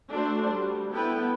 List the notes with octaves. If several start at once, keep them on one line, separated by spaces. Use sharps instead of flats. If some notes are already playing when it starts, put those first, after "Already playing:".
A3 D4 F#4 A4 C5
G3
B3 E4 A4 B4 G5